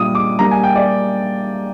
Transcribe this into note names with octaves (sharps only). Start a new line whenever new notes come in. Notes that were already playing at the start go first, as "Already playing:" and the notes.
Already playing: A#2 G3 D4 D#6
D6
G3 A#3 D4 A#5
G#5
G5
D5